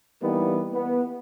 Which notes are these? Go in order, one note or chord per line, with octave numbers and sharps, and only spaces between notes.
E3 G3 A#3 B3 D#4
B3